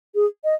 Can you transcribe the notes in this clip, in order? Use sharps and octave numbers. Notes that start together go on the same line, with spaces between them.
G#4
D#5